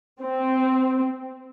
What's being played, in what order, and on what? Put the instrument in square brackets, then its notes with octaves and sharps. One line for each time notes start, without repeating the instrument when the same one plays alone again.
[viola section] C4